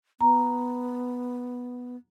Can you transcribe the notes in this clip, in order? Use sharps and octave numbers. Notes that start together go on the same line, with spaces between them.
B3 A#5